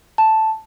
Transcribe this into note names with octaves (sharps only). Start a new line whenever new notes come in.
A5